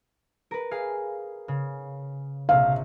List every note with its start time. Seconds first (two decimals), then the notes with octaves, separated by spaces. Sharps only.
0.51 A#4 B4
0.71 G#4 F5 C7
1.48 C#3
2.49 A#1 C3 F5